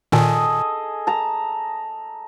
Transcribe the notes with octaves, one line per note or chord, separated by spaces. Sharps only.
A#2 D#3 G#4 A4 D#5
A5 A#5